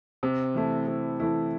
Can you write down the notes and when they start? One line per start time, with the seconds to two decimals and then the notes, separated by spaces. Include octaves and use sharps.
0.23 C3
0.55 E3 A3 E4
0.87 C3
1.20 E3 A3 E4